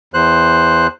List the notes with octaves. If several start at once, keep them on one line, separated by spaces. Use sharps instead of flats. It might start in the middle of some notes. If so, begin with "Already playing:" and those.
E2 C5 F#6